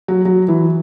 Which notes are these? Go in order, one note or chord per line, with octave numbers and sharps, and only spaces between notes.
F#3
F#3
E3